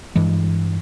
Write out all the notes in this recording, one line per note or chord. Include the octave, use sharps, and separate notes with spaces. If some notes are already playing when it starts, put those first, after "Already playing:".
G2 E3 G#3